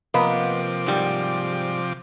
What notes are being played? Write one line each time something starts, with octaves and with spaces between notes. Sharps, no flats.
C3 F3 A#3 B3 B4 D#5 D6
G#2 G3